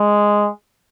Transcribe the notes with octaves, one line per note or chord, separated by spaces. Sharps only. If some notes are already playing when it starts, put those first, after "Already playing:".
Already playing: G#3